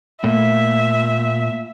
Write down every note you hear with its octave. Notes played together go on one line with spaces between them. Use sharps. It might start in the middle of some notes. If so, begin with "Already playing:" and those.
A#2 A3 E5